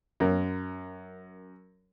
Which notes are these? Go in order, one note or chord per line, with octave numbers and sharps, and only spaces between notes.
F#2 A#4